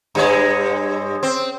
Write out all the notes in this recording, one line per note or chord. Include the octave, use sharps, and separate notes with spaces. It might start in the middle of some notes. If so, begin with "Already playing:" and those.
G2 G#3 C#5
C4